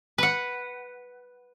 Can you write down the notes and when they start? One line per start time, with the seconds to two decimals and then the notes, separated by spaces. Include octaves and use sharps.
0.18 B4 F#5